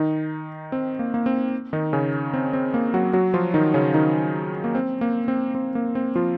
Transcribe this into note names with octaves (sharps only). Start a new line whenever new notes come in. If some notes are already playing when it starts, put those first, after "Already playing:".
Already playing: D#3 D#4
C4
A#3
A#3
C4
D#3 D#4
C#3 C#4
C4
C4
A#3
F#3 F#4
F#3 F#4
F3 F4
D#3 D#4
C#3 C#4
D#3 D#4
A#3
C4
A#3
C4
C4
A#3
C4
F3 F4